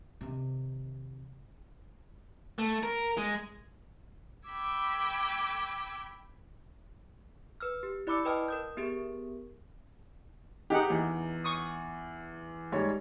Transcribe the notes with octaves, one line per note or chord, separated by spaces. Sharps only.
C3 D#3
A3
A#4
G#3
G5 B5 D6 E6 G#6
B4 E6 F6
G4
E4 D5 B5 D6 E6 C#7
B4 D#5 G5 A5 D#6 F6
A#4 D#6 G6
B3 G4 G#4 A#4
D#4 G4 G#4 F#5
E2
C#6 D#6
G#2 G3 C#5